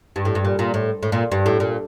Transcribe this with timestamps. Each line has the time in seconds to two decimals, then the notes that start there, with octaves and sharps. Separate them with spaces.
0.16 G2
0.25 A2
0.35 G2
0.45 A#2
0.59 A#2
0.74 A2
1.03 A2
1.12 A#2
1.32 G2
1.46 A2
1.60 A#2